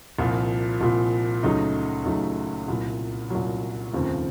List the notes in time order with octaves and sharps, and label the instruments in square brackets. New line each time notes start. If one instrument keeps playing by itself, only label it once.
[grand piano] C2 A#2 F3
C2 A#2 F3
C#2 C#3 F#3 A3 D#4
C#2 C#3 F#3 A3 D#4
C2 A#2 F#3
C2 A#2 F#3
F1 D#2 C#3 F3 C4